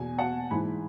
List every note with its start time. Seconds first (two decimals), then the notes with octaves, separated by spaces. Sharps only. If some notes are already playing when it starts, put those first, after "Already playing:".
Already playing: E2 B2 G#5
0.18 F#5 A5
0.51 G#2 E3 G#5 B5